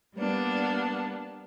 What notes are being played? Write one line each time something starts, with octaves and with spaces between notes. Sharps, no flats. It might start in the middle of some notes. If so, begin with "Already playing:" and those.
G3 A#3 B3 D4